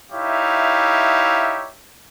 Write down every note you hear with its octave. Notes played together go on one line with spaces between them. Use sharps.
D#4 E4 G4 C#5 E5 F5